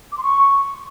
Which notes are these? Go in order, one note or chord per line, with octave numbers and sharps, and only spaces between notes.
D6
C6
C#6